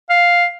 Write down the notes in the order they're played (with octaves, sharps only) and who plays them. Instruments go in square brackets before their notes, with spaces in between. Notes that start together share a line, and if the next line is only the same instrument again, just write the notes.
[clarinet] F5